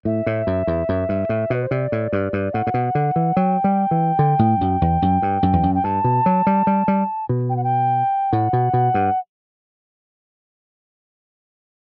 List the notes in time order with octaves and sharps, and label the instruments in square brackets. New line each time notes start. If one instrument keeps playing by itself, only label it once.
[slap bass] A2 [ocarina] E5
[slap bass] A2
F#2
E2
F#2
G2
A2
[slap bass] B2 [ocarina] B4
[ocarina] C5
[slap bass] C3 [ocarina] D5
[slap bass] A2
G2
G2
[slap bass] A2 [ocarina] F#5
[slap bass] A2
B2
D3
E3
[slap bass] F#3 [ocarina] G5
[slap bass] G3
E3
D3
A2
F#2
E2
F#2
G2
F#2
E2
F#2
[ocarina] G5
[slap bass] G2 [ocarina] A5
[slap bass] B2
F#3
G3
G3
G3
B2
[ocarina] G5
F#5
G5
[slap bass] A2 [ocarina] F#5
[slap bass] B2
B2
G2